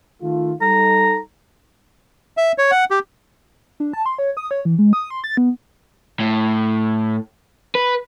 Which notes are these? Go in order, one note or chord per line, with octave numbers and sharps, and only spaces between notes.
D#3 A3 F4
G3 D#4 A4 A#5
E5
C#5
F#5
G4
D4
A5
C6
C#5
D#6
C#5
E3
G#3
D#6
C6
A6
B3
A2
B4